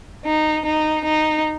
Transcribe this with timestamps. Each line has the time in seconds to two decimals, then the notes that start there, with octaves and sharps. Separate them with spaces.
0.25 D#4
0.65 D#4
1.05 D#4